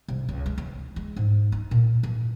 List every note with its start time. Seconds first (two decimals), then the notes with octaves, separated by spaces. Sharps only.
0.08 C2
0.29 C#2
0.46 G#3
0.58 E3
0.96 G#3
1.16 G#2
1.52 D#4
1.71 A#2
2.03 E3